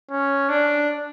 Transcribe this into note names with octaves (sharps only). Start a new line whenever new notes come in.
C#4
D4